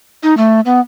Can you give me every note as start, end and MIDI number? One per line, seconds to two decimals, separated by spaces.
0.23 0.37 63
0.37 0.60 57
0.66 0.80 59